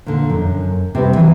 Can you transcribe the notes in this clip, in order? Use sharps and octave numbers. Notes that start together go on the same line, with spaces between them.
A#2 D3
F#2
C3 G3 B4
E3 F#3